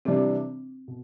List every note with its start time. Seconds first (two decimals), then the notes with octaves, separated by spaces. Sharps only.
0.05 C3 E3 G3 C4 D4
0.88 B2